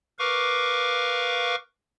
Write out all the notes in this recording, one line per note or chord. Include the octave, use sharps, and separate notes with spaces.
A#4 B4 F5 C#6 D6